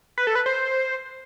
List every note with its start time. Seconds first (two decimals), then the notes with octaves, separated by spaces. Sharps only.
0.18 B4
0.27 A4
0.35 B4
0.46 C5